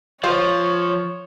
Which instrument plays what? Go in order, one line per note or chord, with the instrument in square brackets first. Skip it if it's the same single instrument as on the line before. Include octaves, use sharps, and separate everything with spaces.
[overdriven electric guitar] F3 [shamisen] F4 C5 F5 [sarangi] C#5